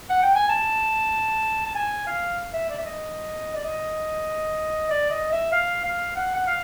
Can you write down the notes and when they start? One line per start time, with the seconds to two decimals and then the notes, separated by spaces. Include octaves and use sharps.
0.10 F#5
0.23 G5
0.35 G#5
0.49 A5
1.66 A5
1.75 G#5
2.07 F5
2.53 E5
2.69 D5
2.77 E5
2.85 D#5
3.55 D5
3.64 D#5
4.90 D5
5.10 D#5
5.32 E5
5.52 F5
5.84 F5
6.16 F#5
6.35 F#5
6.47 F5